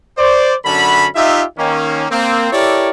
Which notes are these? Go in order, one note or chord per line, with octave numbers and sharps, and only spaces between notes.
C5 D5
F#2 D3 C#4 A5 B5
D#4 F4 G4 E5
D#3 A#3 C#4
A#3 C4
E4 G4 A4 A#4 C#5 D5